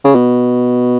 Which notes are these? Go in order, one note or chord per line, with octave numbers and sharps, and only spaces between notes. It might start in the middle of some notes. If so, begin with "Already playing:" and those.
C#3
B2